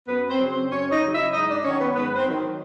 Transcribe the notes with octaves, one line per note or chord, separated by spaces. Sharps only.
F#2 B3 B4
C4 C5
C#3 F#3
C4 C5
F#2 C#4 C#5
D#4 D#5
C#3 F#3
E4 E5
G#2 D#4 D#5
D4 D5
D#3 F#3 C#4 C#5
B3 B4
G#2 B3 B4
C4 C5
D#3 F#3